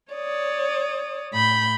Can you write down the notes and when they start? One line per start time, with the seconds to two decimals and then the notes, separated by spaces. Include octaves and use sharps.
0.12 C#5 D5 D#6
1.32 A2 B5 G6